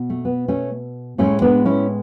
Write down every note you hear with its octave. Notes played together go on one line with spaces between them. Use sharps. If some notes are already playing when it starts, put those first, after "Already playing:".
Already playing: B2
A3
B3
A3 C#4
A2 G#3 A3 C#4
B3 D4
C#4 E4